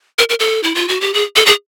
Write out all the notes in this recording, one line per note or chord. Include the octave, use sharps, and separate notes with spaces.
A#4
A#4
A4
E4
F4
F#4
G4
G#4
A4
G#4